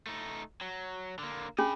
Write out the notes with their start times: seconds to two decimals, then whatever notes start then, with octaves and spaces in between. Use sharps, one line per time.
0.07 A3 D#4
0.61 F#3
1.19 D3 A#3
1.58 C#4 D4 G#4 D#5 B5